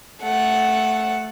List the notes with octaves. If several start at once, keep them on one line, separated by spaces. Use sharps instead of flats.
A3 F#5